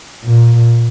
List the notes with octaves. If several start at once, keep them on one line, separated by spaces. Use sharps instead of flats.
A#2